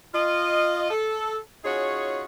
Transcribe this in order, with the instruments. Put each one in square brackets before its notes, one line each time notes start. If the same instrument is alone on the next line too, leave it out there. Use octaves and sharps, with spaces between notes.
[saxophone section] F4 D#5
A4
C#4 D#4 F4 F#4 G#4 C#5